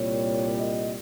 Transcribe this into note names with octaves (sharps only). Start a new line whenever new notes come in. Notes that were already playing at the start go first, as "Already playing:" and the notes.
Already playing: C2 A#2 G3 C#5
D#5